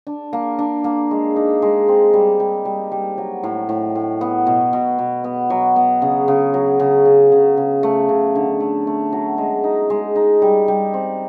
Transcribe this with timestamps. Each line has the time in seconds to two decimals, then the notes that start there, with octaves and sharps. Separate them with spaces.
0.07 D4
0.33 A#3
0.59 D4
0.84 A#3
1.11 G#3
1.36 D#4
1.62 G#3
1.88 C4
2.13 G3
2.40 G3
2.65 G3
2.91 G3
3.18 F#3
3.43 A2
3.69 A2
3.95 A2
4.21 B3
4.47 B2
4.73 B2
4.99 B2
5.24 B3
5.50 F#3
5.76 B3
6.02 C#3
6.28 C#3
6.54 F#3
6.80 C#3
7.05 C#3
7.32 C#3
7.57 C#3
7.83 A3
8.09 C#3
8.35 D3
8.60 A3
8.87 A3
9.13 F#3
9.38 G#3
9.64 D#4
9.90 G#3
10.16 D#4
10.42 G3
10.68 G3
10.94 C4